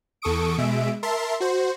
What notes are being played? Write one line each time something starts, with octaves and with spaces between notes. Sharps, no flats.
E2 A4 C#6 D#6 D7
B2 G#3 E5 D7
A#4 E5 A5 C6
F#4 C5